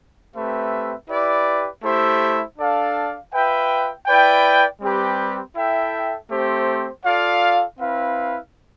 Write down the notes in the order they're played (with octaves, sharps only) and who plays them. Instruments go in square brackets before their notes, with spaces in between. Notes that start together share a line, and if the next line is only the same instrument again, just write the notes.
[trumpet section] A3 C4 G4 B4 E5
E4 G4 B4 D5
A3 E4 G4 C5 E5
D4 A4 D5 F5
F4 B4 E5 G5
E4 B4 D5 G5
G3 C4 G4 B4
E4 A4 E5 G5
A3 C4 G4 C5
F4 A4 D5 F5
C4 E4 B4 F5